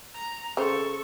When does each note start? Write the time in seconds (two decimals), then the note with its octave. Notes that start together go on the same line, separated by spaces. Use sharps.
0.14 A#5
0.57 C#3 A4 C5 C#6